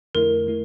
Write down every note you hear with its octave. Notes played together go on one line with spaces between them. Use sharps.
F2 D3 A3 E4 A#4
D3 A3 E4